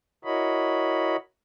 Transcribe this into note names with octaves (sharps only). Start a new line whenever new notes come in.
E4 F#4 A#4 C#5 D#5 B5